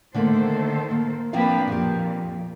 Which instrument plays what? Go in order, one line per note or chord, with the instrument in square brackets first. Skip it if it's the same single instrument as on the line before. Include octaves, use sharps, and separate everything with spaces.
[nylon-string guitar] D3 A3 A#3 [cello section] D#3 A4 C5
[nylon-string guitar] A#3
[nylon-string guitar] F3 C4 F5 [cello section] A#3 D4 B4
[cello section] F2 A#2 [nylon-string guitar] F3 G4